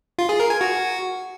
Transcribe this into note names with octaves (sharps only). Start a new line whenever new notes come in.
F4
G#4
A#4
G#5
F#4